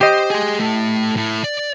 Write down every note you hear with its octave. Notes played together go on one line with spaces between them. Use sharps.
G4 C5 D#5
G#4 C6
A2 A3
A2
D5